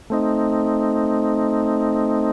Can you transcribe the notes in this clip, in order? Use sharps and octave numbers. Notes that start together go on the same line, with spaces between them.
A3 C4 D#4